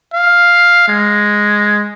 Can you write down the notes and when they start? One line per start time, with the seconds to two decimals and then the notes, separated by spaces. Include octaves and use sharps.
0.13 F5
0.88 G#3